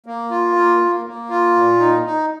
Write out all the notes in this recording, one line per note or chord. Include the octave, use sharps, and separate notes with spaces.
A#3
F4
A#3
A#3
A#3
F4
A#2
D#4
D#4